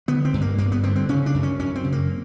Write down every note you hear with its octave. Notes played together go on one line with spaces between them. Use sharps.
D3 B3
C4
G2
A#3
G2 A#3
B3
D3 C4
C4
C#3 C#4
D4
F#2
C#4
F#2 C#4
C4
C#3
A#3